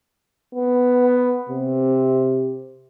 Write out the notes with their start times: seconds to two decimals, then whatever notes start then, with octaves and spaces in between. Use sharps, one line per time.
0.55 B3
1.49 C3